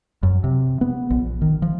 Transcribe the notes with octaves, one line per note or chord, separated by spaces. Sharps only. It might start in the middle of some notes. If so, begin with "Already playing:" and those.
F#2
C3
B3
A#1
D#3
F3